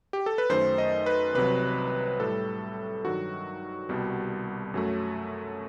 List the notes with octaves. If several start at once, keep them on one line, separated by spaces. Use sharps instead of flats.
G4
A4
B4
F#2 D#3 A3 C5
D#5
B4
C2 C3 F#3 B4
A2 G3 A4
G2 D#3 F#3 F#4
C2 B2 G3
F#2 F#3 A3